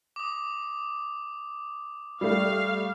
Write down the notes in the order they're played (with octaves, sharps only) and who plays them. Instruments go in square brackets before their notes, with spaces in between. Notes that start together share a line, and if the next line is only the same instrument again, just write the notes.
[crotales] D6 D#6
[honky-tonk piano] G3 A3 [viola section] F5